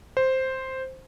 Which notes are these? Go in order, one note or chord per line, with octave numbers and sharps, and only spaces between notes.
C5